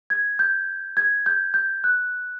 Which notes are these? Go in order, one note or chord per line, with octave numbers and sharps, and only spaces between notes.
G#6
G6
G#6
G6
G6
F#6